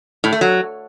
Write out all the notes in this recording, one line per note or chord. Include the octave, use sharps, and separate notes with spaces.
A2
A3
F#3